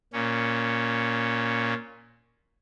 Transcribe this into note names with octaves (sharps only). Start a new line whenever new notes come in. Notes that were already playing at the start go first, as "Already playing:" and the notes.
A#2 C#4